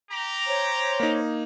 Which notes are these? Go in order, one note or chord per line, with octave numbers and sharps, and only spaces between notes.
G4 A#5
C5 C#5
A#3 D#4